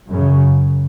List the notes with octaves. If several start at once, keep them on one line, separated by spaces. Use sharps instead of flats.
F#2 C#3